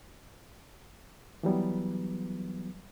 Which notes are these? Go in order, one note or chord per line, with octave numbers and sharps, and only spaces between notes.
E3 F#3 G3 B3